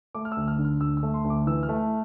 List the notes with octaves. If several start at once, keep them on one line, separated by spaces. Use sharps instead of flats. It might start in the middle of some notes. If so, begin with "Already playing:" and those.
A3 D6
F6
D2 E6
F6
D3
F6
D2 E6
E6
A3
C6
D2
D6
E3 E6
F6
A3